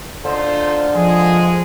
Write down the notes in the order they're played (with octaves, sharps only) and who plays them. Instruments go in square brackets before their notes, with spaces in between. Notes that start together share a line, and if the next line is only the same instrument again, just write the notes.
[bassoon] D3 [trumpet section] D#4 F4 C5
[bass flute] F3 [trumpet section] G#3 G#4